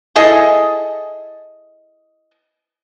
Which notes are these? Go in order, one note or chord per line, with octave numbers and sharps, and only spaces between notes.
E4 G#4 A4 D#5